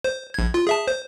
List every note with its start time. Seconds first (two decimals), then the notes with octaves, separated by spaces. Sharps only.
0.04 C5
0.34 A#1 G#6
0.54 F4
0.67 G#4 E5 A5
0.88 C5